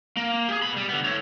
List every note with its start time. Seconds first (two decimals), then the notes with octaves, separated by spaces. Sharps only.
0.17 A#3
0.49 G4 G#4
0.62 B2 B5
0.76 G3
0.89 D3 B3
1.04 A4 C#5